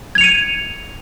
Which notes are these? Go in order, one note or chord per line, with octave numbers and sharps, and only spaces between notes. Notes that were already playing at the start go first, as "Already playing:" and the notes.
G#6 C#7 D#7 F7